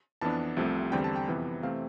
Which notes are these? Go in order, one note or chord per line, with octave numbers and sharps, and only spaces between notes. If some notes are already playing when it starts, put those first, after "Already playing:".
F2 E3 B3 D4 A5
C2 C3 F3 A3 C4
E2 D3 G3 C4 G5
A5
G5
F2 C3 E3 B3
C3 E3 A3 C4 F5